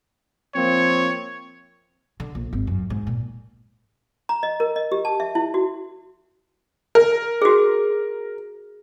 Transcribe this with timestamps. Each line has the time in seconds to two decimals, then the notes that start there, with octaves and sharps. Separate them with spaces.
0.55 F3 A#3 C4 C#5
2.20 D3
2.35 A#1
2.53 G#1
2.67 F#2
2.90 G#2
3.07 A#2
4.29 A#5
4.43 D#5
4.60 A#4
4.76 D#5
4.92 G4
5.05 A5
5.20 E5
5.35 E4
5.54 F#4
6.95 A#4
7.42 F#4 G#4